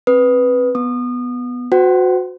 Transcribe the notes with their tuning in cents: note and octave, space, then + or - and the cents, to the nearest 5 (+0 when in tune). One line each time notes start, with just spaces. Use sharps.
C4 +25 B4 +0 D#6 +0
B3 +0 D#6 -30
F#4 -20 C5 -40 F#5 +45